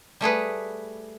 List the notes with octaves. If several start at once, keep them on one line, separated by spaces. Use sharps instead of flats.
G3 A3 G#4 B4